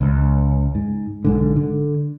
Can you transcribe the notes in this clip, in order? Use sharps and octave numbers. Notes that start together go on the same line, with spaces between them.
C#2
G#2
B1 G#2 D3
D3